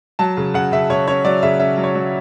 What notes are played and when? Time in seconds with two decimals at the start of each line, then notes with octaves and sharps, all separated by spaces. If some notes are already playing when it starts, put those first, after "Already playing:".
0.19 F#3 A5
0.37 C#3
0.54 C#3 F#5
0.72 C#3 E5
0.90 C#3 C#5
1.07 C#4 C#5
1.25 F#3 D5
1.43 C#3 E5
1.59 C#4 E5
1.78 F#3
1.84 C#5
1.95 F#3